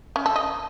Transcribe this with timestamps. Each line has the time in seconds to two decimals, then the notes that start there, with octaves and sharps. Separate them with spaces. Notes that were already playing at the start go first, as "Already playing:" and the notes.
0.16 C#4
0.26 A4
0.36 D#5